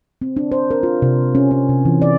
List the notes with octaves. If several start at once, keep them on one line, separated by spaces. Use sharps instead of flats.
C4
D4
C5
A#4
F4
C3
C#4
C#4
C3
E3
D5